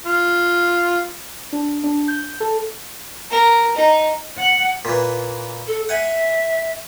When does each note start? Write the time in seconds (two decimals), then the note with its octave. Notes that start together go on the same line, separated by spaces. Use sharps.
0.05 F4
1.53 D4
1.84 D4
2.08 G6
2.40 A4
3.31 A#4
3.77 D#4
4.37 F#5
4.85 A#2 E3
5.67 A4
5.89 E5 F#5 G#5